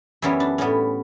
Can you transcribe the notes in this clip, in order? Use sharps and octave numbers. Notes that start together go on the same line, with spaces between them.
F#2 E3 G3 B3 C#4 E4
D4
A2 G3 B3 C#4